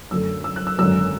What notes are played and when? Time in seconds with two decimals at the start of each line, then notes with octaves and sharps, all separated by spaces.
0.11 F#2 D3 A3 E6
0.44 E6
0.56 F#6
0.67 E6
0.78 G#1 F#2 D3 F#3 E6